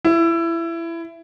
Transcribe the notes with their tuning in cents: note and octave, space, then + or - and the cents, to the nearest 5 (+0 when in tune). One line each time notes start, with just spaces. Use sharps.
E4 +20